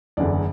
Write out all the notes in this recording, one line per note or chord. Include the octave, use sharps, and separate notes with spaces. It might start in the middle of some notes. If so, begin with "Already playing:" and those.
F#1 E2 D3 D5